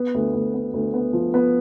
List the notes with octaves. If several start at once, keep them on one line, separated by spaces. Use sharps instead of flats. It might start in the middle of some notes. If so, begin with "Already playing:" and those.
Already playing: B3
D2
D2
B3
D2
B3
F3
B3